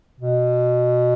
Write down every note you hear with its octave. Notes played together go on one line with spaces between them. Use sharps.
B2